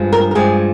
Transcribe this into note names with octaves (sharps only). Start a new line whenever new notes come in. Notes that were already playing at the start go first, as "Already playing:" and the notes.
Already playing: G2 F3 G#3
A#4
A#4
G2 F3 G#3 G#4